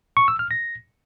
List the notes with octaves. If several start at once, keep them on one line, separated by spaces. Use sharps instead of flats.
C#6
E6
F6
A#6